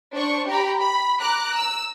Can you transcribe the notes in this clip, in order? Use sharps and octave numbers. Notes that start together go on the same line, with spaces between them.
D4 C5 C#6
G4 A#5 B5
B5
A#5 D6 F#6
E6